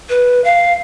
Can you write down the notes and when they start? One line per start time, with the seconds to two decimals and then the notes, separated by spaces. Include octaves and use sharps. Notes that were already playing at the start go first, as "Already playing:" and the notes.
0.09 B4
0.44 F5